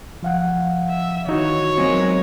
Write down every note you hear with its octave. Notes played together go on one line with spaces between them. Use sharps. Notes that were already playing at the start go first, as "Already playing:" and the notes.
F3 F5 F#5
E5
D#3 E3 D#4 F#4 C#5
F#3 G#3 B3 C4 F4 A#4